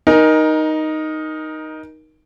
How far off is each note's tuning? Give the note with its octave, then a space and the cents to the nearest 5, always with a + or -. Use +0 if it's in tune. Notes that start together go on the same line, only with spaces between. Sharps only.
D#4 +0 A#4 +20 G#5 +5